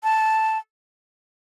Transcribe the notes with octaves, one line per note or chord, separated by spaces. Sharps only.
A5